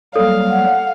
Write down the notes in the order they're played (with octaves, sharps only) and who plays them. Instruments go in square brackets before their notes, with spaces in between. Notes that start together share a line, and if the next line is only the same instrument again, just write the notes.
[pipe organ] F#3 G3 A#3 [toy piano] A4 [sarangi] F5
[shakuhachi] F#5